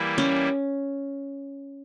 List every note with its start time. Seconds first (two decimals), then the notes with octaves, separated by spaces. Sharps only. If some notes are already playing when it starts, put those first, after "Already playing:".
Already playing: E3 G3 A#3 E4
0.18 C#4